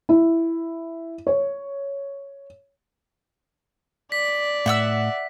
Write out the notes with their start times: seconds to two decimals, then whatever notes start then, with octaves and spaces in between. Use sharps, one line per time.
0.09 E4
1.27 C#5
4.12 D5 B6
4.66 A2 E5 F#5 E6